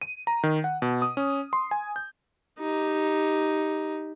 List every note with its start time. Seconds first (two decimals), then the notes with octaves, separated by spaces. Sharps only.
0.02 D#7
0.27 A#5
0.43 D#3
0.64 F#5
0.82 B2
1.02 D#6
1.17 C#4
1.53 C6
1.71 G#5
1.96 G6
2.59 D#4 G4